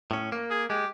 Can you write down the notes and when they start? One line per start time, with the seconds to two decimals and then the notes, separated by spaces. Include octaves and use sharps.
0.11 A2 C#4
0.32 A#3
0.51 G#4
0.70 G#3 G4